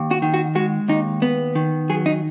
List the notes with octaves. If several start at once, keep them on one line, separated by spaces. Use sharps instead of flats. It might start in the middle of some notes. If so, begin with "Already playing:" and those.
Already playing: D#2
F#4
D#3
F#4
G#3 F#4
D#2 D#4
B3
D#3
F#3 G#4
D#4